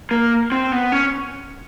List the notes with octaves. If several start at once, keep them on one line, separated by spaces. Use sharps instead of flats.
A#3
C4
B3
C#4